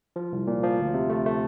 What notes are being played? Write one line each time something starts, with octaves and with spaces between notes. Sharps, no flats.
F3
C2
A#2
F3
D2
C3
A3
A3